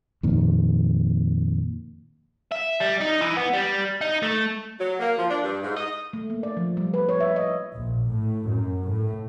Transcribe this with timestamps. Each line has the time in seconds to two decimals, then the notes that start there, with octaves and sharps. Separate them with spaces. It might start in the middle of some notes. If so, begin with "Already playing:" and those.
0.23 F2 A#2 D#3
2.52 E5
2.81 G3
3.01 D#4
3.21 E3
3.37 B3
3.53 G3
4.01 D#4
4.23 A3
4.79 F#3
5.00 A#3
5.18 F3
5.30 D4
5.43 G2
5.63 G#2
5.76 D#5
6.13 A3
6.30 A#3
6.43 D5
6.57 F3
6.77 G3
6.94 B4
7.09 C#5
7.20 E5
7.36 D#5
7.74 A#1
8.09 A2
8.50 F#2
8.89 A2